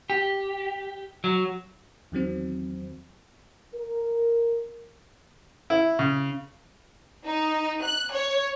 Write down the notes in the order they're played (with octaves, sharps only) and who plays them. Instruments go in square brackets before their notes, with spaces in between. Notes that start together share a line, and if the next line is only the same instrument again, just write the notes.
[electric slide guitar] G4
F#3
[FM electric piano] E2 D#3 F#3 C4
[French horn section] A#4
[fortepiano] E4
C#3
[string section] D#4
F#6
C#5